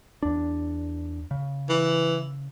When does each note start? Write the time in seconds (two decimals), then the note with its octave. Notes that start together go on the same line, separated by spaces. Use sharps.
0.23 E2 D4
1.31 C#3
1.69 E3